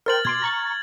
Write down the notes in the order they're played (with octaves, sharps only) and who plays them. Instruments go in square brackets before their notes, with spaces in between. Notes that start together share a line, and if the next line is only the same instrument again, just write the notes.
[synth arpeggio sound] A#4 C5 G5 [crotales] F6 A6 F#7
[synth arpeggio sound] B2 C6 D6 [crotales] G#6
[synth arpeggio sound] A#5 C#6 A6